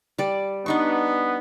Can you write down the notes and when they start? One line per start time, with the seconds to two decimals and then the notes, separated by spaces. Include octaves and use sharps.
0.18 G3 D5
0.66 B3 D4 D#4 C#6